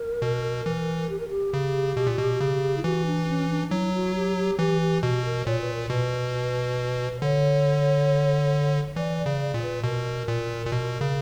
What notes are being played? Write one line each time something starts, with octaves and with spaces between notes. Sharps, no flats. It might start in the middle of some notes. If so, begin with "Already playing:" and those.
Already playing: A#4
B2
E3
G4
A#4
G4
C#3
B2
A#2
B2
C#3
E4
E3 F#4
D4
C#4
D4
F#3 E4
F#4
G4
G4
E3 G4
G4
B2 F#4
A#4
A#2 C#5
B4
A#4
B2 B4
D3 C#5
E3 D5
D5
C#3
D5
A#2
B4
B2 A#4
A#2
A#2
B2
C#3